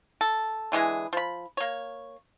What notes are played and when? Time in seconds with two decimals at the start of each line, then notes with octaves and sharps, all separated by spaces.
0.21 A4
0.72 D3 E3 G#3 G#4
1.13 F3 B5
1.57 A#3 C#5